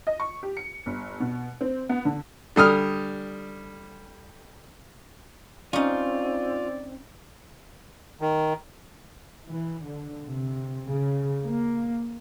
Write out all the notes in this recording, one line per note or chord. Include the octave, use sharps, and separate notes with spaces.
D#5
C#6
G4
C#7
G1
B2
C4
B3
D3
D3 G3 D#6 F6
C4 C#4 D#4 F4 D5
D#3
E3
D3
C3
C#3
A#3